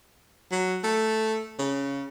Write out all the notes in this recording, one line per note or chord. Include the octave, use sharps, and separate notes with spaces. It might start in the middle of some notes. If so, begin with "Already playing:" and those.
F#3
A3
C#3